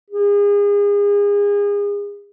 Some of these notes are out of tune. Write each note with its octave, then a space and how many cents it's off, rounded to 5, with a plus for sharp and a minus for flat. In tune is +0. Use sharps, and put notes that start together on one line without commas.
G#4 -35